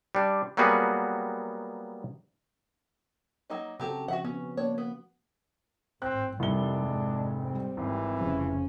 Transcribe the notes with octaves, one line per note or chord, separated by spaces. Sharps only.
G3 D4
F#3 G3 A#3 B3 F#4 G#4
F#3 A#3 D#4
C#3 F#3 C4 F#4 G4 A4
F3 F#4 E5 F#5
B3 C#4 F#4
A#3 D4 C#5
B3
G#1 A2 C4 F#6
F1 D#3 G3 D4 E4 G7
G#1 G#3
G3 C4
G#1 E3
F1 C#3 F3 C#4